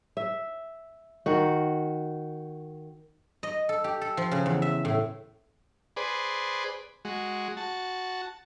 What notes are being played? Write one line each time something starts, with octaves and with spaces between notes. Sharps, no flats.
E5
D#3 F#4
D#5
A4
G4
A4
F3
C#3
E2
E5
A2
G#4 B4 C5 D5
G#3 F#4
F#4 A5